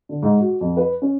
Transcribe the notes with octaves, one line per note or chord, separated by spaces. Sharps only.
D3
G#2
F#4
F2
B4
C#4